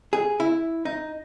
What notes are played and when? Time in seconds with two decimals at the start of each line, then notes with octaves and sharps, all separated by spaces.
0.13 G#4
0.40 E4
0.85 D#4